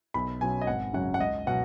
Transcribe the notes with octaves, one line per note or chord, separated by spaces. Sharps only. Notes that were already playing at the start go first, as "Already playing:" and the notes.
B1 B5
B2 F#3 C#4 G#5
D#5
G#1 F#5
F#2 C#3 F#3 F#5
F#5
C#2 D#5
B2 F#3 F#5